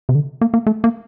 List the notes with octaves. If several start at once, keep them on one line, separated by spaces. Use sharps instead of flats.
C3
D3
A#3
A#3
A3
A#3